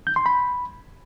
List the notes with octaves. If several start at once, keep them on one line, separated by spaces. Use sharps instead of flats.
G6
C6
B5